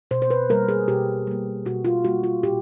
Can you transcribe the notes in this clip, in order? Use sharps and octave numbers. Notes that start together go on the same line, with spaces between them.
B2 C5
C5
B4
G3 A#3 A#4
G#4
B2 G4
G3 A#3
B2 F#4
F4
G3 A#3 F#4
F4
A#2 G4